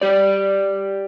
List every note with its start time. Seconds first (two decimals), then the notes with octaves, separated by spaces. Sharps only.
0.01 G4 D5